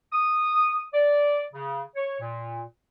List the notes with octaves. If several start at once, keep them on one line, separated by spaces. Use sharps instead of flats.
D#6
D5
C#3
C#5
A#2